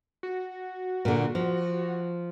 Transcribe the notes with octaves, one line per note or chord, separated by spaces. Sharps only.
F#4
A#2 D3
F3